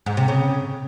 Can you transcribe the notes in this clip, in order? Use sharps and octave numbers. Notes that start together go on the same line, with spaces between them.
G#2
C3
C#3